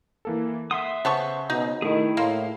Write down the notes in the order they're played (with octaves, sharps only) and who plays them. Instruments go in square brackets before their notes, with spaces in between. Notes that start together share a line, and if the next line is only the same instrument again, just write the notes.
[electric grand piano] E3 A#3 A4
[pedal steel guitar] E5 C6 D#6 [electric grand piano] F#5
[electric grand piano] C#3 C5 [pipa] B3 A4 C#6
[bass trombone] B2 [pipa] D#4
[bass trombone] D#3 [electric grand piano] A3 [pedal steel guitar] E4 G#4
[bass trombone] A2 [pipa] A#3 [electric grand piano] F5 C6